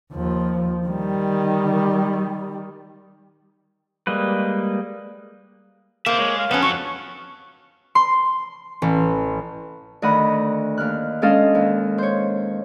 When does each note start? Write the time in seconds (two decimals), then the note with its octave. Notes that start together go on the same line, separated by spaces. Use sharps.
0.13 D#2 F3
0.87 D#3 G3
4.07 G3 G#3 A#3 B4
6.06 A#3 C5 E5
6.19 G#3 C#5
6.38 F5
6.51 F2 B3 C#4 A4
6.62 F#3 C#6
7.95 C6
8.82 A1
10.02 D2 D#3 D#5 F#5 B5
10.78 D#2 F6 F#6
11.22 G#3 C#4 D4 A4 D#5 F5
11.55 D#2
11.98 C5 C#5